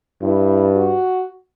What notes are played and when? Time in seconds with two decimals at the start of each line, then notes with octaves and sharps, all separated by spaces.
0.22 G2 E4
0.75 F#4